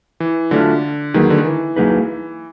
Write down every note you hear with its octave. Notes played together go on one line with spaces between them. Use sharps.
E3
D3 F#3 A3 D4 F4
D#3 F#3 A#3 D#4 G#4 B4
D3
D#3
E3
F#3 A#3 D#4 G#4 B4